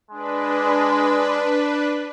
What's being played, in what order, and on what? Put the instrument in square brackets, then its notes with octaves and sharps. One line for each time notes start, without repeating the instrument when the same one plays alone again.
[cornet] G#3 [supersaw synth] D4 B4